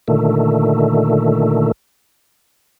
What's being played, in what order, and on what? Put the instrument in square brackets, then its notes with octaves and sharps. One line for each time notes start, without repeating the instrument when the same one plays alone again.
[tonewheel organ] A#2 D3 D#3 A3